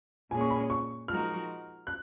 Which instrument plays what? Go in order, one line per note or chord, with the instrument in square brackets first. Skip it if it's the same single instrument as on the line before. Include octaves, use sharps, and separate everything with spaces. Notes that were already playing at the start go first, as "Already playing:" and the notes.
[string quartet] A#2 G#3 C#4 G#4 [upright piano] G#5
[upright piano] C#6
B5
C#6
[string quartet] F3 G#3 D#4 F#4 A#4 [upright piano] F6
[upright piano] F#6